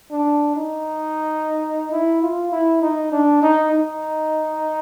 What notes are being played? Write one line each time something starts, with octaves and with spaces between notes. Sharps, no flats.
D4
D#4
E4
F4
E4
D#4
D4
D#4
D#4